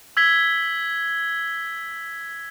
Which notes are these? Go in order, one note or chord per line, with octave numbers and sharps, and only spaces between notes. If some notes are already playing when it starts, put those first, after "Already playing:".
E6 G#6 B6 G7